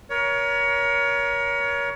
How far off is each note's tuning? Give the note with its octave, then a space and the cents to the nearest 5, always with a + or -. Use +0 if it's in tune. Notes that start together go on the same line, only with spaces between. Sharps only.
A#4 +30 C#5 +25